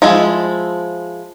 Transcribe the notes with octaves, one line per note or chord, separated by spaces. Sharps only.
F3 G#3 E4